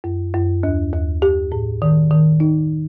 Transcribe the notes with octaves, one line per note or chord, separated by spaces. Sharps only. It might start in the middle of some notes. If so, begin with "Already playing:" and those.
F#2
F#2
D#2
D#2
G4
A2
D#3
D#3
D#4